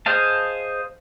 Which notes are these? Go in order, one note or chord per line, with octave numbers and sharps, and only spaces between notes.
G#4 C5 D#5 F5 A5